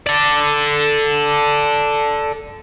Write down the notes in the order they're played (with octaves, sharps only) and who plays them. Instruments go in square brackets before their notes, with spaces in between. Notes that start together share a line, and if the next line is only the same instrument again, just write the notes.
[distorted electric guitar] A4 D5